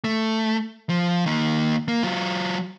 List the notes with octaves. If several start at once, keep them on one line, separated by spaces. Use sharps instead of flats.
A3
F3
D#3 A#3
A#3
F#3 F4